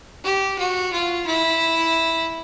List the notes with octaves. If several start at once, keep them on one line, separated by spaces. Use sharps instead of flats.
G4
F#4
F4
E4